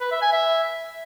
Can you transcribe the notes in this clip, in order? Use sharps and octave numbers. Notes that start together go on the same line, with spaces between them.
B4
E5
G#5
E5